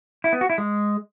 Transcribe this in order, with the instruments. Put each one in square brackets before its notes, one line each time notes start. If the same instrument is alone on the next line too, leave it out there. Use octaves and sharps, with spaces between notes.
[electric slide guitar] E4
B3
F#4
E4
G#3